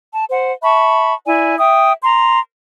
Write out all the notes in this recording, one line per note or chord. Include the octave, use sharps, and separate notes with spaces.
A5
C5 F#5
E5 A5 B5 C#6
E4 D5 G#5
E5 G5 D#6
A#5 C6